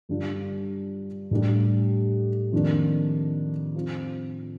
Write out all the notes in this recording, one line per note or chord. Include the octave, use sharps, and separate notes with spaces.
G2 D3 G3 D4 F4
A2 G3 D4 G4
F2 D#3 A#3 D4
F3 C4 F4